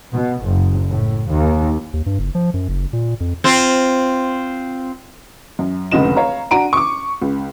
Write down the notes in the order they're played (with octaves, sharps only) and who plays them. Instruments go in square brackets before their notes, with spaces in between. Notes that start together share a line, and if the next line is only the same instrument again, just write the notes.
[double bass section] B2
F#1
A2
D#2
[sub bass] D#2
G2
F#1
F3
F#2
F#1
A#2
F2
[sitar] C4 F4
[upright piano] F#2
F1 C#2 D3 D#5 E7
C#5 F5 A#5
D4 F#4 A#5 D7 D#7
C#6 D6
C#2